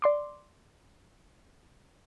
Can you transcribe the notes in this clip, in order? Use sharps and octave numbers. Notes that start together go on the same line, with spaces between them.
D5 C6 D6